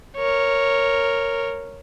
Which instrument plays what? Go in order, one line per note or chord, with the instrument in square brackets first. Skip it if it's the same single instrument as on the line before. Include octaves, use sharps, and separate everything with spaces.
[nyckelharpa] A#4 C#5